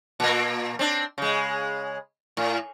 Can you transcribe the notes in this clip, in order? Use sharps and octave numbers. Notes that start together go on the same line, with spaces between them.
A#2 A#3
C4 D4
C#3 G#3
A2